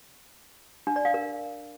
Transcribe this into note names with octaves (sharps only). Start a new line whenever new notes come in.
D4
D5
F5
A#4